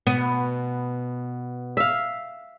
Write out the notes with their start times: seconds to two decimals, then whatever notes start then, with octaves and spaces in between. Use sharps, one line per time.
0.07 B2 B3
1.77 E5 F5